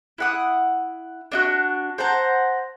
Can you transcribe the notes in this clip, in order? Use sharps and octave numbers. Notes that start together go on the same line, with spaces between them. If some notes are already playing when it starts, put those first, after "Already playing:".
E4 F#5 D#6
D4 D#4 F#4
C5 F#5 A5 A#5